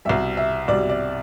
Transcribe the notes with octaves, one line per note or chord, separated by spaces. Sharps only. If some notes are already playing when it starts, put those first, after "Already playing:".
C2 B2 G3 E5
E5
C2 B2 G3 D5
D5